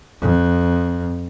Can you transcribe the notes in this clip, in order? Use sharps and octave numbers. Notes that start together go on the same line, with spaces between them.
F2